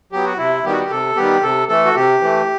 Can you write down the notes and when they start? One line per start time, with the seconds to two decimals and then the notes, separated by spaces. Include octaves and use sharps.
0.12 F#3 B3 G4
0.25 F#4
0.38 C3 E4
0.65 D#3 G3 B3 G4
0.72 F#4
0.81 G4
0.90 C3 A4
1.16 D#3 G3 B3 G4
1.42 C3 A4
1.68 E3 A3 A4
1.86 F#4
1.95 C3 G4
2.21 E3 A3